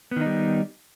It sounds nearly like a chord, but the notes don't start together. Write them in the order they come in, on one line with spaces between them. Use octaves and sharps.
B3 D#3 D#4 G3